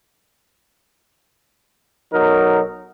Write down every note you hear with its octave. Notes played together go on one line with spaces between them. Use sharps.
B1 F#3 D#4 A#4